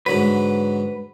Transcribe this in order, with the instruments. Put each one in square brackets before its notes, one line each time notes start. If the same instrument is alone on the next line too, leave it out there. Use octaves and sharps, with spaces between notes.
[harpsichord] G#2 D3 F#3 [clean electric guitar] B4